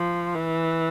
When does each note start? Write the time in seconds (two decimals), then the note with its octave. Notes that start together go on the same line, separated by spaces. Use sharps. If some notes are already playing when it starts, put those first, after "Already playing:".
Already playing: F3
0.35 E3